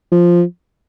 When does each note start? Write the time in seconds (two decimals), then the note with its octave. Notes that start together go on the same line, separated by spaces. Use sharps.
0.12 F3